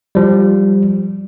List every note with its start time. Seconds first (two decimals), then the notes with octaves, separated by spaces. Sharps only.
0.15 F3 G3